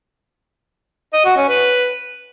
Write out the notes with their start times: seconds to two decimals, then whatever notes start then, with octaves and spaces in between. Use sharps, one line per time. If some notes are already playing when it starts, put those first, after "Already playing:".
1.13 D#5
1.25 F#4
1.37 C#4
1.49 B4